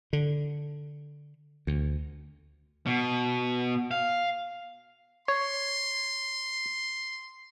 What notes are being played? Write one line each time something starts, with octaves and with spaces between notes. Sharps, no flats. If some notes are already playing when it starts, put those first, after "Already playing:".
D3
D2
B2
F5
C#5 C6